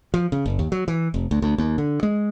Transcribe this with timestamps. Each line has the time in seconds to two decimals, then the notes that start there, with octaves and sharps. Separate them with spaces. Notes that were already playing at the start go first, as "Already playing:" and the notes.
0.14 F3
0.32 C#3
0.46 F#1
0.59 D#2
0.72 F#3
0.88 E3
1.14 F1
1.31 D2
1.42 D2
1.58 D#2
1.78 D3
2.03 G#3